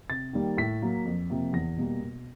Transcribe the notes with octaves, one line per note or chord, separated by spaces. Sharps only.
C3 A6
D#3 G3 A#3
A2 B6
F#3 A#3
F2
C3 F3 A#3
E2 A#6
B2 G3 A#3
B2